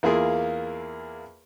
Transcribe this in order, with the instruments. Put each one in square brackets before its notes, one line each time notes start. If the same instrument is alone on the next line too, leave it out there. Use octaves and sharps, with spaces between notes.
[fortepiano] E2 A#3 E4 F4 G#4 A#4